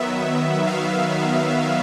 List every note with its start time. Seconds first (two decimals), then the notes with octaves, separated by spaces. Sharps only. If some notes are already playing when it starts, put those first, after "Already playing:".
Already playing: D#3 F#3 B3 E5
0.67 F5